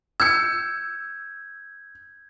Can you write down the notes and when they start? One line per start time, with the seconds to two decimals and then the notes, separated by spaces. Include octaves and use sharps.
0.20 E6 G6 G#6 C#7